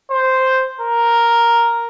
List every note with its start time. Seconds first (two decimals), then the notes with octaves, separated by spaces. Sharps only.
0.11 C5
0.81 A#4